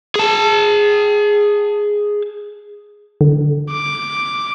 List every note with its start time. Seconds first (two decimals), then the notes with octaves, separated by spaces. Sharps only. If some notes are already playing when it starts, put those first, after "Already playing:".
0.16 G#4 A5
3.21 D3
3.72 D6